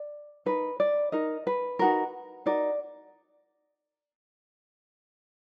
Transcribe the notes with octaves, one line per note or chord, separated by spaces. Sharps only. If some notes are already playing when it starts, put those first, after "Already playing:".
Already playing: D5
D#4 A#4 B4
D5
D#4 A#4 D#5
B4
D#4 F#4 A#4
D#4 F#4 A#4 D5